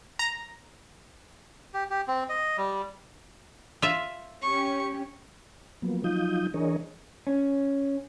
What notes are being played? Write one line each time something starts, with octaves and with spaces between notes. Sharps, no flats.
A#5
G4
G4
C4
D#5
G3
F4 E5
C#4 G4 C#6
F3 F#3 A#3 B3
F3 F#3 D#4 F4 D#6 G6
E3 D4 G#4 A#4 C#5 D#5
C#4